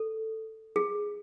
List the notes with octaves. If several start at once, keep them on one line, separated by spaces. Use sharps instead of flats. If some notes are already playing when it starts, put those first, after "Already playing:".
Already playing: A4
G#4